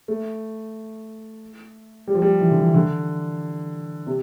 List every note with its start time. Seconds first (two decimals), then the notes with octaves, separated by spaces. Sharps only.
0.08 A3
2.08 G3
2.15 F3
2.22 G3
2.41 E3
2.51 D3
2.60 E3
2.74 D3
4.07 C3